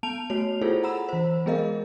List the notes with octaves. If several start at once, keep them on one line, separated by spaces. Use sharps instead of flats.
B3 A5 D7 F7
A3 F#4 C#5 F7
E4 F4 G#4 A4 C5
F#5 A#5 B5 E6 E7
E3 C5
G#3 B3 G#4 A#4 D#5 F5